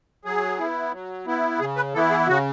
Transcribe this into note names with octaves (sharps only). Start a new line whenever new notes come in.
F#3 G#4
B3 E4
F#3
B3 E4
C#3 G#4
B4
E3 B3 E4 A4
G#4
C#3 F#4